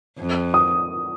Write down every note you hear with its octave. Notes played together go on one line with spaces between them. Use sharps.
F2
D#6